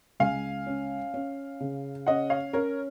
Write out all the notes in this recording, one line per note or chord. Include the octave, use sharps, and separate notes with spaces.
C#2 F5 G#5
C#4
C#4
C#3
C#4 D#5 F#5
C#5 F5
C#4 A#4 C#5